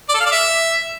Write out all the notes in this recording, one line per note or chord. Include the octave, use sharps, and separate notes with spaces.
D5
A4
F5
D5
E5